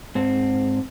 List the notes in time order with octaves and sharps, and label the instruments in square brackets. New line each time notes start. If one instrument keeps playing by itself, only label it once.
[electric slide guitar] G#2 C4